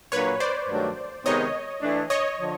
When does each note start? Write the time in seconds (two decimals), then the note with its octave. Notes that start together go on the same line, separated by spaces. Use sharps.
0.12 A#2 F#3 A#3 D4 F#4 B4 C#5
0.40 C5 D5
0.69 G2 D#3 F#3 A3 D4
1.25 C3 D#3 G#3 B3 D#4 C#5 D#5
1.82 E3 A3 D4
2.10 C#5 D#5
2.38 D3 F3